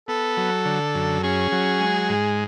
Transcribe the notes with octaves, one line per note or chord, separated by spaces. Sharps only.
B3 A4
F#3
D3
F#2
C#4 G#4
F#3
G#3
G#2